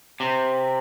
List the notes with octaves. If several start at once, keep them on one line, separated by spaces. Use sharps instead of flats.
C3